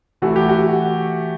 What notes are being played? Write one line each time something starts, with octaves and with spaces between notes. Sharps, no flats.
C3 E3 A3 F#4
G4
F#4